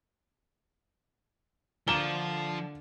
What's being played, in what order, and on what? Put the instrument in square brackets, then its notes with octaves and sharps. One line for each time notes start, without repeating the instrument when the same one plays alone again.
[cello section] D3 [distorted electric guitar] F3 [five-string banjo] A#3 [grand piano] E7 G7